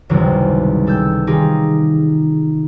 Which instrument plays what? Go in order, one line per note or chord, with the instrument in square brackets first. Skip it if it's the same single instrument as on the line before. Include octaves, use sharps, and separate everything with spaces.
[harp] G#1 C#2 F#2 C3 E3 G3
G3 A4 E6 G6
D#3 D#4 F4 G4 G#4